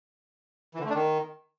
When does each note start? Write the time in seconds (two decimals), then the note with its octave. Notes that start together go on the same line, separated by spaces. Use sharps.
0.75 E3
0.80 D3
0.85 A3
0.90 D4
0.95 D#3